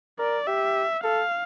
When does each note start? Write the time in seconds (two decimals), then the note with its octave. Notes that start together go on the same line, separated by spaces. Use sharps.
0.18 A#4 D5
0.46 G4 E5
1.04 A4 F5